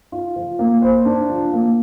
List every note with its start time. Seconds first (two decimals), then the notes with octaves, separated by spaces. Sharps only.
0.12 F4
0.36 F3
0.59 A#3
0.82 C5
1.05 D4
1.30 F3
1.53 A#3